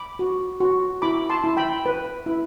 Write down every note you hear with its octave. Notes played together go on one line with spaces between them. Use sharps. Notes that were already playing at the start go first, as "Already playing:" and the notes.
Already playing: B5 D6
F#4
F#4
E4 B5 D6
A5 C6
E4
G5 B5
B4
E4